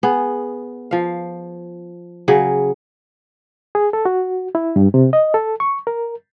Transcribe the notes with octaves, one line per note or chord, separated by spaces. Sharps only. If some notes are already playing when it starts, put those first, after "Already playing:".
B3 G#4
F3 F5
C#3 F#3 G#4
G#4
A4
F#4
E4
G2
C3
D#5
A4
C#6
A#4